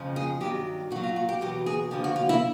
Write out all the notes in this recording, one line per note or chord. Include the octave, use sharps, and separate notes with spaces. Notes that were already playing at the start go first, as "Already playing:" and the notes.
Already playing: F2 C#3 F3
G#4
G2 D#3 F#3 G4
A#2 F#4
F#3
F4
F#4
G4
E2 B2 F#3 G4
G#4
F2 D3 F3 G4
F#4
F4
E4